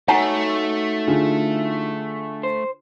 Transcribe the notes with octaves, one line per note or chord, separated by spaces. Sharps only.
A3 D#4 F#4 C#5 F#5 G#5 A#5
D3 F4 G#4
C5